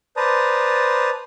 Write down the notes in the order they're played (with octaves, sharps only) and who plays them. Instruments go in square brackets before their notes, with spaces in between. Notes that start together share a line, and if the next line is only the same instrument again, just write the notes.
[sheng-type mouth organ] B4 C5 D5 A5 A#5 D#6